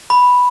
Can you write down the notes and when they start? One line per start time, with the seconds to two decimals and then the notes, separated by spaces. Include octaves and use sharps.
0.10 B5